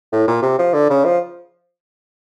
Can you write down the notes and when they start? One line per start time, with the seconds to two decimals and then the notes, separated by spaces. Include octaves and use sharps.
0.13 A2
0.28 A#2
0.42 C3
0.59 F3
0.74 D3
0.90 C#3
1.05 F3